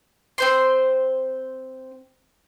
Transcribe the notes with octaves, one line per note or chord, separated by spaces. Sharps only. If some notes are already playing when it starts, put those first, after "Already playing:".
C4 C5 C6